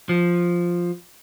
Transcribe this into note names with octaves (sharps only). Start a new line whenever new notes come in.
F3